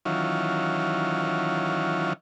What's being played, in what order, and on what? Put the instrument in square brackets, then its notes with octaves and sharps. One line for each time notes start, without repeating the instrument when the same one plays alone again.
[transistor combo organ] D#3 E3 F#3 C#4 F4